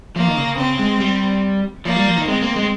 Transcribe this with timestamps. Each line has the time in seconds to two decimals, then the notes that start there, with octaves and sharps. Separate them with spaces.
0.16 F3 A#3
0.27 D#3
0.37 C#3
0.58 C#3 C4
0.79 G#3
1.00 G3
1.85 F3 A#3
1.96 G3
2.06 F3
2.18 D#3
2.28 G#3 C4
2.42 A#3
2.56 G#3